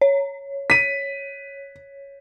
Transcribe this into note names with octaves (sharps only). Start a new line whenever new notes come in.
C#5
B6 D#7